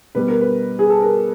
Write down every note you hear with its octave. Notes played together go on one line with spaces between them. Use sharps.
B2 G3 B3 B4
A#4
B4
G#4
A4
A#4